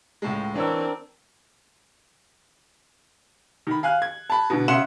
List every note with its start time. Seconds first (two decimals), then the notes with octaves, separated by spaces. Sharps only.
0.22 C#2 A2 G#3
0.55 E3 C4 D4 A#4 C#5 E6
3.67 D#3 B5
3.83 F5 G#5 F#6
4.02 G#6
4.30 A5 B5
4.50 B2 D3
4.68 C#3 E5 F#5 C6 E7